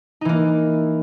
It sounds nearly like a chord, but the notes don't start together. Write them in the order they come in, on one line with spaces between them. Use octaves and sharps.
D#4 E3 A#3